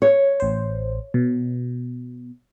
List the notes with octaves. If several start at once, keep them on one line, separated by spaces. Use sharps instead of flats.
C#5
A1 C5
B2